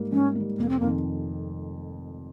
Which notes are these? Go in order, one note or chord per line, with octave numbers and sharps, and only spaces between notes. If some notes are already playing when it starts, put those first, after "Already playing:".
Already playing: G#2 G3 A#3
G#2 C#4
G3 A#3
F1 A#3
C4
F2 D#3 A#3